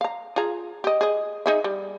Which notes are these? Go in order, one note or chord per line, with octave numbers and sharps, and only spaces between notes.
F5 A#5
F4 G#4 A#5
G4 D#5
G#4 D#5
D#4 G#4 E5
G3